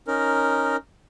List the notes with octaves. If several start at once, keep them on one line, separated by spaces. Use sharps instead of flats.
C#4 D#4 A#4